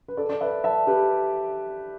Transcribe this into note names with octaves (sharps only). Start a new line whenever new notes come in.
B4
A4 D5
D5
B4 E5
E5 A5
G4 B4